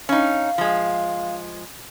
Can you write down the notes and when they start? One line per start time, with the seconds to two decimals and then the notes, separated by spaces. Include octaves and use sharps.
0.09 C#4 D#4 F5
0.58 F3 G#3